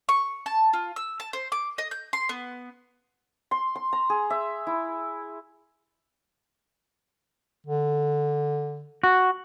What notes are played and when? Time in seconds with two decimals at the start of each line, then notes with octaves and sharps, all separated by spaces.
0.09 C#6
0.46 A5
0.73 F4
0.96 E6
1.20 A5
1.33 C5
1.52 D6
1.78 D#5
1.91 G6
2.13 C6
2.29 B3
3.51 C6
3.75 C6
3.93 A#5
4.10 G#4
4.30 E5
4.67 E4
7.67 D3
9.03 F#4